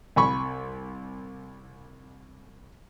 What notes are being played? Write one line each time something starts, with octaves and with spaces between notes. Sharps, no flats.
C2 G#5 B5 C#6